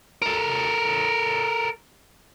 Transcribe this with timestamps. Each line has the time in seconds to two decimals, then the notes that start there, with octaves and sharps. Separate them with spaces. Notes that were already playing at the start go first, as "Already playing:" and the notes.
0.22 A4 A#4